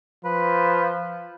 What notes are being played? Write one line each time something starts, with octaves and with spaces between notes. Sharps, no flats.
F3 B4